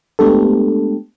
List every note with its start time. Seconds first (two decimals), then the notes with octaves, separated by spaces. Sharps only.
0.19 G#3 A3 B3 D4 G4 A4